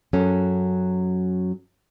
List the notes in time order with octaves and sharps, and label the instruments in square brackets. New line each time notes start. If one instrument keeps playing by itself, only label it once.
[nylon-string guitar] F#2 F#3 C#4 A4